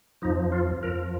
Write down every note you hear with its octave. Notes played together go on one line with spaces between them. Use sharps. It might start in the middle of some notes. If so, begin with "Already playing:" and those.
F2 F3 D#4
F4
F2 F3 A#4